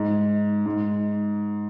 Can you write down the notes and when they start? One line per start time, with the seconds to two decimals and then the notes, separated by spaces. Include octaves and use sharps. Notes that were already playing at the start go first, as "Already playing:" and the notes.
Already playing: G#2
0.66 G#2